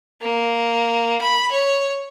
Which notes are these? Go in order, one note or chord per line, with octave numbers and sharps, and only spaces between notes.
A#3
B5
C#5